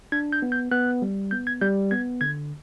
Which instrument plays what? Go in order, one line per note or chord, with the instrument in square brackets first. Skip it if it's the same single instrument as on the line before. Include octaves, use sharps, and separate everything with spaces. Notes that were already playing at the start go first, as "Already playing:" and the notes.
[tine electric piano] D4 G#6
G6
B3
G6
B3 F#6
G3
B3 G6
G#6
G3 G6
B3 G#6
D3 G#6